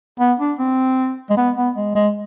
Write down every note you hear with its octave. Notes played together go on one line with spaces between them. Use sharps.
B3
D4
C4
G#3
B3
B3
G#3
G#3